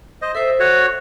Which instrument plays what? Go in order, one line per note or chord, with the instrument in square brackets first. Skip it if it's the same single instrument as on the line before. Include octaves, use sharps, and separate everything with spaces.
[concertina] C5 D#5
[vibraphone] A4 C5 [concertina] E5
[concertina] F#4 C#5